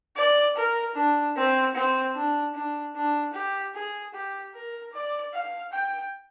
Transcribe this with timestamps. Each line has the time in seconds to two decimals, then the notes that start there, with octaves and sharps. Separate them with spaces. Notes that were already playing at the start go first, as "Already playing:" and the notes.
0.16 D5
0.56 A#4
0.95 D4
1.36 C4
1.75 C4
2.15 D4
2.54 D4
2.95 D4
3.34 G4
3.74 G#4
4.13 G4
4.54 A#4
4.92 D5
5.33 F5
5.72 G5